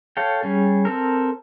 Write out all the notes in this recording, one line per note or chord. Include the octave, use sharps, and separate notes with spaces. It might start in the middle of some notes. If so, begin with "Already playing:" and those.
A4 C#5 F5 G5
G3 C#4 G#4
C4 A4 A#4